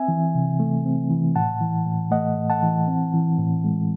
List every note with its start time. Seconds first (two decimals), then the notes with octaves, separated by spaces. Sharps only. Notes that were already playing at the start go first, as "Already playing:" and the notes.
Already playing: C4 E5 G#5
0.08 E3
0.35 C3
0.60 A3
0.85 C4
1.10 E3
1.35 A2 F#5 A5
1.61 E3
1.86 A2
2.11 A3 D#5 F#5
2.37 A2
2.50 F#5 A5
2.63 E3
2.88 C4
3.14 E3
3.38 A2
3.64 G#3